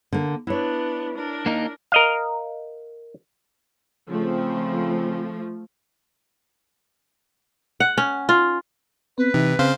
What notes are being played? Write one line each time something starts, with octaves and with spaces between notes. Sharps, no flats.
D3 A#3
B3 D4 E4 C#5
D4 A#4
A#3 D#4
A#4 D#5 F5
C#3 F3 A3 C4
F#5
C#4
F4
B3 C4 B4
C3 E3 D#4
C#3 C4 C5 F5